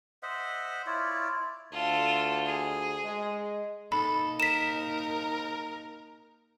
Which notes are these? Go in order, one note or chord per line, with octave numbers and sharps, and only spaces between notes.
C5 D#5 E5 F#5
E4 F4 C#5 D5
D2 F4 A4
G#4
G#3
A#3 D#4 A4 B5
A#4 B6 E7